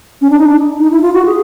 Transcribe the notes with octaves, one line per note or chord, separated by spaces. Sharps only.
C#4
D4
D#4
D4
D#4
E4
F4
F#4
G#4